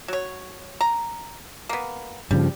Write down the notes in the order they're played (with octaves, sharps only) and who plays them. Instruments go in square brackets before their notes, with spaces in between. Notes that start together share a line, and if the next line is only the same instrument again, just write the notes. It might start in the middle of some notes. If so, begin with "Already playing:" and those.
[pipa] F#3 C#5
A#5
A#3 B3
[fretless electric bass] G2 C#3 F3 [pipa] G3